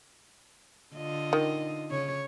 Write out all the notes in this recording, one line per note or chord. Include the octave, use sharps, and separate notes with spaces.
D3 F4 D#5
D#3
C#3 C#5